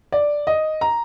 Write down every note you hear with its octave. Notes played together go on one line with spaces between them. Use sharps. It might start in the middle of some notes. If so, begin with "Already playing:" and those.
D5
D#5
A#5